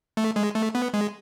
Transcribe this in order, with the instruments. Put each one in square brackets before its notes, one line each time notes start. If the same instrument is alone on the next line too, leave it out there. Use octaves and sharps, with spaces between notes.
[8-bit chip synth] A3
G#3
A3
B3
G#3